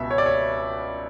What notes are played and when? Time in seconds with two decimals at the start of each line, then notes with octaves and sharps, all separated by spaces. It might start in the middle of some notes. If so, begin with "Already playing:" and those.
Already playing: C#2 B2 E5
0.11 C#5
0.18 D5
0.26 C#5